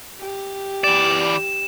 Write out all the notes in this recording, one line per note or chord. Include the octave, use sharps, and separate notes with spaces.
G4
E3 D5 E7